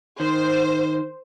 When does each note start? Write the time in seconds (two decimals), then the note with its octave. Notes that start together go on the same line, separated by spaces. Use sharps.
0.20 D#3 C5